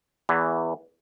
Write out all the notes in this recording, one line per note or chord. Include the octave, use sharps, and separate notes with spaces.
E2 E3